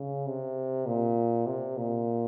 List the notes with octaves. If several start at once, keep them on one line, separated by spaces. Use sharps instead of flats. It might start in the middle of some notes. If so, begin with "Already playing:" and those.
Already playing: C#3
C3
A#2
C3
A#2